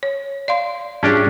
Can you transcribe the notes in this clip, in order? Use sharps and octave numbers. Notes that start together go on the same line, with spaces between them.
C#5
D5 F5 C6
G#2 G3 C#4 D4 G4 G#4